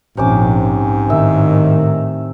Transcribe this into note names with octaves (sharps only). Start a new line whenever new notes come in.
A#1 G#2 C3 C#4 D6
A2 D#3 E5